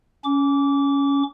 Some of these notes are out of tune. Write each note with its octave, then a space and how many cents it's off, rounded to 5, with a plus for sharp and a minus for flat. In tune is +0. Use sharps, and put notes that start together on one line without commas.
C#4 +10 D6 -25